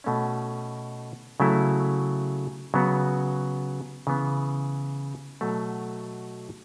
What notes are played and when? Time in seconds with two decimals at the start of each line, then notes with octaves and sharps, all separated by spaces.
0.04 B2 A3 C#4
1.40 C#3 F#3 A3 E4
2.74 C#3 F#3 B3 F#4
4.07 C#3 E3 B3
5.41 B2 F#3 A3 F#4